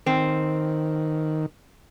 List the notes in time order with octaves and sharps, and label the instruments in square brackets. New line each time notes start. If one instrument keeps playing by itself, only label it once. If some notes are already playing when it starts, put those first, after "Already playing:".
[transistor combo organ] D#3 [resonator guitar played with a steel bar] C4